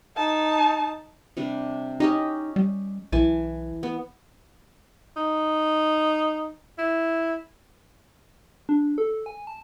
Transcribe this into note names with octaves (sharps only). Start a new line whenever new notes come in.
D#4 A5
C3 G3 D4
C#4 D#4 G4 D#5
G3
B1 E3 G#5 A5
B3
D#4
E4
D4
A4
G#5
A5